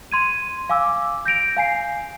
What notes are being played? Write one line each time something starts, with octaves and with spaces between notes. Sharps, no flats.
C6 G#6 D#7
F5 G#5 D6 E6
G6 A#6 D7 F7
F5 G#5 C7